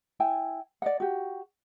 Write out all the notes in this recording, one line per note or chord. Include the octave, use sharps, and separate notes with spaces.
E4 G5 G#5
D5 D#5 F#5
F#4 G4